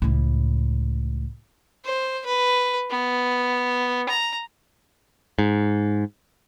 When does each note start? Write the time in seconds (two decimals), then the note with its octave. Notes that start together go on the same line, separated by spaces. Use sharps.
0.02 C#2 A2
1.84 C5
2.26 B4
2.90 B3
4.09 A#5
5.39 G#2